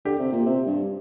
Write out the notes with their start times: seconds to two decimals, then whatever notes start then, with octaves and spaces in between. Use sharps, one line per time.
0.05 D3 G4
0.19 C3
0.32 A#2
0.46 C3
0.66 G2